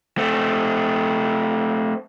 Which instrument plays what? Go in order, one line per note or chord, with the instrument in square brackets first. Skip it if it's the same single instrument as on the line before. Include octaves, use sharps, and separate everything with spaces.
[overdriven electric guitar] A3 C4